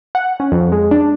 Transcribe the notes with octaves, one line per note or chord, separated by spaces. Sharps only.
F#5
C#4
F2
G#3
D4